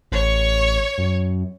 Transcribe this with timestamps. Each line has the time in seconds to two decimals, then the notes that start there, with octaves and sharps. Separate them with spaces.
0.12 A1 C#5 C#6
0.98 F#2